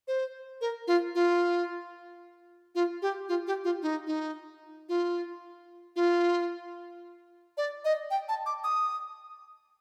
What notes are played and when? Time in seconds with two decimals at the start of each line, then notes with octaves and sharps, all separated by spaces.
0.08 C5
0.61 A#4
0.87 F4
1.15 F4
2.75 F4
3.02 G4
3.29 F4
3.47 G4
3.64 F4
3.82 D#4
4.07 D#4
4.89 F4
5.96 F4
7.57 D5
7.85 D#5
8.11 G5
8.29 A5
8.46 D6
8.64 D#6